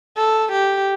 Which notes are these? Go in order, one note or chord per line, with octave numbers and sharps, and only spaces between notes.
A4
G4